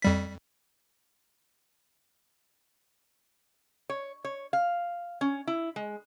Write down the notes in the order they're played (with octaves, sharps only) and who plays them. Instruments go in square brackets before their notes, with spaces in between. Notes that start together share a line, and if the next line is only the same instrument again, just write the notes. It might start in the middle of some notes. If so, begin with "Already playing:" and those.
[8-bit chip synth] F2 G3 B6
[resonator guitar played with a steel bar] C#5
C#5
F5
C#4
E4
G#3